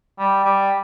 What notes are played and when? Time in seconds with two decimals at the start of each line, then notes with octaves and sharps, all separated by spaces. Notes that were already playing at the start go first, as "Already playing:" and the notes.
0.19 G3
0.44 G3